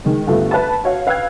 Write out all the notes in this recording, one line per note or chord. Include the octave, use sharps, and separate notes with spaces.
D#3 G#3
G2 D3 A3 B3 F4
B4 E5 A5
F#4 C#5 F5
B4 F5 G5 E6 F#6 G#6